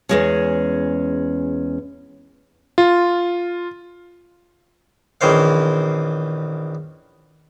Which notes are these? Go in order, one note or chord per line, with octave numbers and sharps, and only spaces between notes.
E2 G#3 C#4
F4
A#1 D#3 E3 C#4 C5 F5